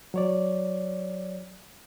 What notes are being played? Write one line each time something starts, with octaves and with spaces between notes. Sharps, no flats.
F#3 C#5 D5